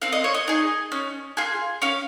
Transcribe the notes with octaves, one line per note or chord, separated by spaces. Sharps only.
C4 F5
D#5
C#5
D#5
D#4 G#4 D#5
C#4
F4 G#4
C#4 F5